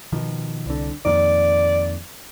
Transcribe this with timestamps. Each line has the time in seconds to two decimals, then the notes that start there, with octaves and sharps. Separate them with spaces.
0.12 B2 D#3 F3
0.66 C2 D3
1.05 F2 A#2 D#3 D5